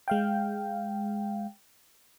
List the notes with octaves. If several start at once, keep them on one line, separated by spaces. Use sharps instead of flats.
G#3 F5 G5